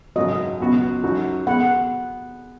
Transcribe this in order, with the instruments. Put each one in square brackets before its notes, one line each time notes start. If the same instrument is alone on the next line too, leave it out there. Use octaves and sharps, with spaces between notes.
[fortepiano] G#1 F#2 C#3 F#3 [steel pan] D#5
[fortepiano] C#2 B2 F#3 B3 F#4
F#2 F#3 D#4 F#4
[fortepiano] G#3 B3 [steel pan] F#5